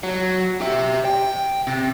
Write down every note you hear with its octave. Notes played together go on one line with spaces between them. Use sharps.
F#3
G4 E5
G5
C3